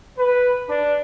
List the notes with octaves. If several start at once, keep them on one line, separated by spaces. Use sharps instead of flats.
B4
D4